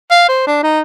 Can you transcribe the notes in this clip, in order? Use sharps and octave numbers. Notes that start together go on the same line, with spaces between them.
F5
C5
D4
D#4